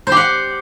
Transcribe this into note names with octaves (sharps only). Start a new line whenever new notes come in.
G4 C5 F#5